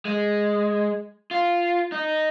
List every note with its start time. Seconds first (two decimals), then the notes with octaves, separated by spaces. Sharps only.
0.05 G#3
1.31 F4
1.92 D#4